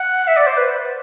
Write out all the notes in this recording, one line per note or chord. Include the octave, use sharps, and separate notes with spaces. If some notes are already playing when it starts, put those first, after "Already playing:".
Already playing: F#5
E5
D5
C5
B4